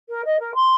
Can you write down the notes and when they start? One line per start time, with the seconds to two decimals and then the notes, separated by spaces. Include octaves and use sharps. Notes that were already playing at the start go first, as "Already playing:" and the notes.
0.09 A#4
0.25 D#5
0.40 A#4
0.55 C6